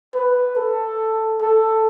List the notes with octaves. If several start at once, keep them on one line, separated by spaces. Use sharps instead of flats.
B4
A4
A4